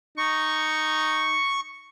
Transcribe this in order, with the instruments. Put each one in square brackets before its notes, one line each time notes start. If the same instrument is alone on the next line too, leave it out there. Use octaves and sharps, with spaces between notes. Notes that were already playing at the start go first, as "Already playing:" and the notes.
[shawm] D#4 [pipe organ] C#6